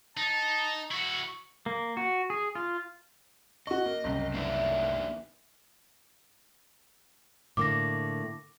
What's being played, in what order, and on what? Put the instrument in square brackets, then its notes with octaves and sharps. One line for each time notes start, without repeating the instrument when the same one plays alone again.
[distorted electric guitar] D#4 [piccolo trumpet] A5
[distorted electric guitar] E4 F#4 [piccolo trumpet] C#6
[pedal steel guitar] A#3
F#4
G#4
F4
[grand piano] F#4 C#6 [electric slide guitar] D#5
[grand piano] A#3
[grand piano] F#1 C2 [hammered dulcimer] A#4
[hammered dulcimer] D3 E3 [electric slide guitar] A#3 D4 D#4
[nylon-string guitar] A2 D3 A#3 [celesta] D6 A#6